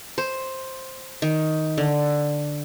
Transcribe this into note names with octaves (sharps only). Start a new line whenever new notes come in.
C5
D#3
D3